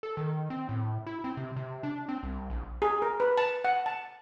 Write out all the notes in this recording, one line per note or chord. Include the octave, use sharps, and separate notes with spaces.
A4
D#3
C4
A2
E4
C4
C3
C3
D4
C4
C2
A#1
G#4
A#4
B4
A5
F#5
A5